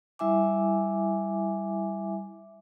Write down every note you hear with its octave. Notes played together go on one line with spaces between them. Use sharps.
G3 E4 E5 G#5 D6